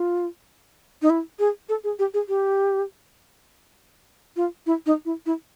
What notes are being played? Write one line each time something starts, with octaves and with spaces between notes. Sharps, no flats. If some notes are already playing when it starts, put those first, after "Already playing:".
Already playing: F4
D#4
E4
G#4
A4
G#4
G4
G#4
G4
F4
E4
D#4
E4
E4